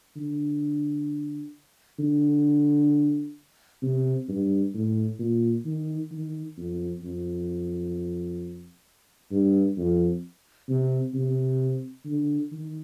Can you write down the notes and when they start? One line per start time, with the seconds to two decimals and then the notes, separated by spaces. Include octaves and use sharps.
0.16 D3
1.99 D3
3.83 C3
4.29 G2
4.74 A2
5.19 A#2
5.66 D#3
6.11 D#3
6.57 F2
7.03 F2
9.32 G2
9.78 F2
10.69 C3
11.14 C3
12.06 D3
12.52 D#3